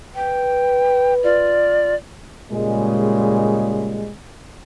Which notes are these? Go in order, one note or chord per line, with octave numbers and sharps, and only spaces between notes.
B4 G5
F4 D5
A#2 C#3 G3 G#3